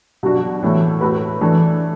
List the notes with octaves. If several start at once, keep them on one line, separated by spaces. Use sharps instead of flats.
B2 F#3 D4 F#4
A2 E3 A3
A3 F#4 B4
E3 A3 D4 A4